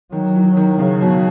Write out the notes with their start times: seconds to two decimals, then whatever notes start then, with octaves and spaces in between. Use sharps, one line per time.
0.12 D#3 F#3
0.35 E3
0.57 D#3
0.79 C#3 F#3
1.01 B2